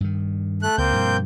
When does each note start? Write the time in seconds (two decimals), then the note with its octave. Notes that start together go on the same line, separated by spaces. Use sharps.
0.01 G2 D#3
0.62 A3 F#6
0.78 C#2 A#3 C4 G6
0.93 G2 B2 F3